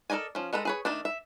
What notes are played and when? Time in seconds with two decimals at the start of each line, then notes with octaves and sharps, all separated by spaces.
0.10 A4 A#4 D5 D#5 G#5
0.35 F3 C#4
0.53 G#3 A4 B4 A#5
0.65 G#4 B4 C#5
0.85 D#3 A3 D4
1.05 E5